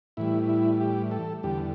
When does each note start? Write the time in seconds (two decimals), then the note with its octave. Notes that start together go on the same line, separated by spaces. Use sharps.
0.17 A2 E3 G3 E4
0.49 E4
0.80 G4
1.11 A4
1.43 E2 D3 G3 G4